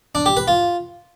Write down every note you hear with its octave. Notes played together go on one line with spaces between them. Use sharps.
D4
G4
B4
F4